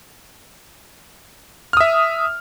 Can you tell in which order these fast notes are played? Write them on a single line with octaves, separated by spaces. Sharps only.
F6 D#6 E5